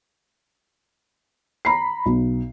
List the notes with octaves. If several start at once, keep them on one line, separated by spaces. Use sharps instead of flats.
A#5 B5 C7
B1